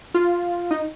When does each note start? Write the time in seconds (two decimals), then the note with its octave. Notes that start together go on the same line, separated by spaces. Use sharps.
0.14 F4
0.71 D#4